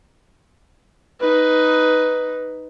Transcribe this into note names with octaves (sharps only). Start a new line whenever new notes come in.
D#4 B4